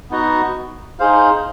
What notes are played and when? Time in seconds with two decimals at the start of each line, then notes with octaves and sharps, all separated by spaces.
0.11 B3 D#4 F#4
0.99 D#4 G#4 C5 F5